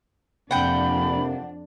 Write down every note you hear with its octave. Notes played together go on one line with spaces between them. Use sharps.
F2 C3 A#3 D4 F#5 G5 B5